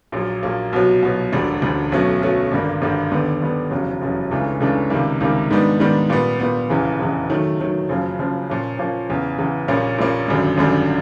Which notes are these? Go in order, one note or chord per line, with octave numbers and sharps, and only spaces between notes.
A#1 A#2 F#3 A#3
A#1 A#2 F#3 A#3
C2 B2 F#3
C2 B2 F#3
E1 D2 D3 G3
E1 D2 D3 G3
B1 B2 F#3 A3 C#4
B1 B2 F#3 A3 C#4
G#1 G2 D3 G3 A#3
G#1 G2 D3 G3 A#3
D#2 D3 G3 B3
D#2 D3 G3 B3
F1 E2 C#3 F#3
F1 E2 C#3 F#3
C#2 C#3 E3 A3 D4
C#2 C#3 E3 A3 D4
C#2 C3 D#3 G3 A#3
C#2 C3 D#3 G3 A#3
G#2 D#3 G3 B3 D4
G#2 D#3 G3 B3 D4
A#2 G3 B3
A#2 G3 B3
F1 E2 C#3 E3
F1 E2 C#3 E3
D#3 F#3 A3
D#3 F#3 A3
F#1 F#2 C#3 F3
F#1 F#2 C#3 F3
A#2 F3 A#3 C#4 F4
A#2 F3 A#3 C#4 F4
E2 C#3 E3
E2 C#3 E3
A#1 A#2 G3 A#3 C#4
A#1 A#2 G3 A#3 C#4
G#1 F#2 D3 G3
G#1 F#2 D3 G3